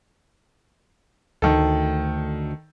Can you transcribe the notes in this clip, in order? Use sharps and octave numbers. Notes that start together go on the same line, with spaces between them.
D2 D#3 A4